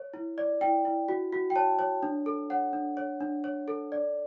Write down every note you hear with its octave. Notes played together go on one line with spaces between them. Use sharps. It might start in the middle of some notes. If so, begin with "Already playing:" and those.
Already playing: C#5
E4
D5
E4 G5
E4
F#4
F#4
G5
C#5 A5
C#5
D4
A4
C#5 F#5
D4
C#5
D4
C#5
A4
D5